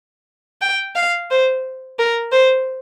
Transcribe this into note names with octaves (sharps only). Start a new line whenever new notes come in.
G5
F5
C5
A#4
C5